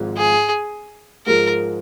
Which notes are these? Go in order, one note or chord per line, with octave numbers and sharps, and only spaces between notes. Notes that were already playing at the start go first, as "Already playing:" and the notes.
Already playing: G#1 G#2 F3
G#4
G#2 F3 G#3 A#4